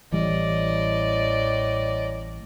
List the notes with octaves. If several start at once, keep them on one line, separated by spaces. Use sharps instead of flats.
A1 A2 E3 G3 D5 D#5